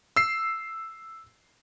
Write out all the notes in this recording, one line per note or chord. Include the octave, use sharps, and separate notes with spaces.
E6 C7